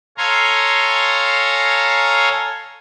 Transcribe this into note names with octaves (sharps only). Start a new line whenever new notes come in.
A4 C#5 F5 G#5 A#5 C6